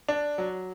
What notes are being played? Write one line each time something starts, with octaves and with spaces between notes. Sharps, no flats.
D4
F#3